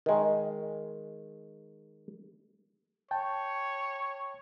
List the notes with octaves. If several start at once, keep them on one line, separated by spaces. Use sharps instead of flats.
D#3 G#3
C#5 G5 A5